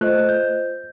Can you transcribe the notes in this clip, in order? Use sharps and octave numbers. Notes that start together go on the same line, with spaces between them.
A3 F4 C5 D#5 F#6
G6